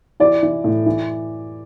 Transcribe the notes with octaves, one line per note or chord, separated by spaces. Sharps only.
E3 D5
E3
A2
E3